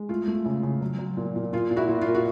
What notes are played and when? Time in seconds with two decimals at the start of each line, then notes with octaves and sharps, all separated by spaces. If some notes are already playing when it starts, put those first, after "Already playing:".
Already playing: G#3
0.09 A3 F4
0.28 A3
0.46 C#3
0.63 C#3
0.81 F#3
0.99 F#3
1.17 A#2
1.36 A#2
1.53 A#2 F4
1.71 A#2
1.76 E4 F#4
1.89 A#2
2.01 F4
2.07 A#2
2.15 F#4